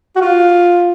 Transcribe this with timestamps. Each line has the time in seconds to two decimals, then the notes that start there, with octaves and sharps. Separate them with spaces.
0.16 F#4
0.20 F4